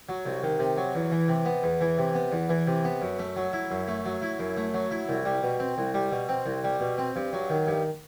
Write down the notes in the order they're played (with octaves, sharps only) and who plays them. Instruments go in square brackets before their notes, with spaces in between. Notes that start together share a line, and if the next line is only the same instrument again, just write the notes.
[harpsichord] F#3
C2
D#3
C3
F#3
E2
E3
C3
B3
E2
E3
C3
B3
E2
E3
C3
B3
F#2
A3
F#3
E4
F#2
A3
F#3
E4
F#2
A3
F#3
E4
C2
G3
B2
C4
C2
G3
B2
C4
C2
G3
B2
C4
G2
F#3
D#3
G2